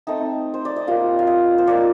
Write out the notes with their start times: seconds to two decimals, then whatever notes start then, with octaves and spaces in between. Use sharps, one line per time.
0.07 A3 C4 D#4 A5
0.54 C5
0.65 D5
0.76 D#5
0.87 G3 A#3 F4 F5
1.19 F5
1.27 D#5
1.58 C5
1.67 F3 A#3 D#4 D5